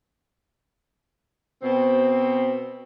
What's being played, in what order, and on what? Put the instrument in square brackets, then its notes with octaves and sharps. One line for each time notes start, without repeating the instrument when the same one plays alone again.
[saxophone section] B2 C4